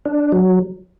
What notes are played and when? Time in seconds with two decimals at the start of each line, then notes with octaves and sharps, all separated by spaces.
0.05 D4
0.32 F#3